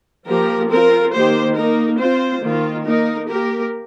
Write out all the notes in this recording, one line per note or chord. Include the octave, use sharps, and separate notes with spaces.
F3 A#3 G4 A#4
C4 F4 A#4
D#3 A#3 G4 C5
A#3 D#4 A#4
C4 F4 C5
D#3 A#3 F4
A#3 D#4 A#4
A#3 G4 A#4